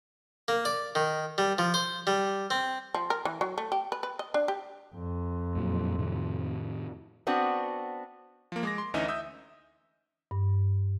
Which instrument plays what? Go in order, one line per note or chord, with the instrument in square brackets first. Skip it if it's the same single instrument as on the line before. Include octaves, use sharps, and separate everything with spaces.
[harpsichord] A#3
D5
D#3
G3
F3
C5
G3
C4
[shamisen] F3
A#4
E3
F#3
A3
G4
B4
B4
D#5
D4
G4
[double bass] F2
[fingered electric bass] F#2 A#2 F#3
A2 C3 D#3
[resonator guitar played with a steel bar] B3 C4 D4 F#4
[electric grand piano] F3 A#3
G#3 D6 A#6
C6
D2 E3 C#4 D#4 D#5 E5
E5 D#6 E6 G6
[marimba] G2